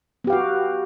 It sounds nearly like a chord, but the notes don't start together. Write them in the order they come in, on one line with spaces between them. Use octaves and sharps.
B3 G4 F5 F#4